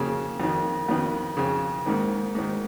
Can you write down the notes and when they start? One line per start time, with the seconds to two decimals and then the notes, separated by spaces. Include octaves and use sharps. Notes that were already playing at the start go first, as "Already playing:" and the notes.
Already playing: F2 C#3 A#3
0.40 F2 D#3
0.88 F2 D#3 B3
1.37 F2 C#3
1.86 G#2 D#3 A#3
2.35 G#2 D#3